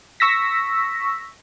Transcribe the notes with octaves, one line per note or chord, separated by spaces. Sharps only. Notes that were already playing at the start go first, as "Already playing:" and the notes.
C#6 E6 A#6 B6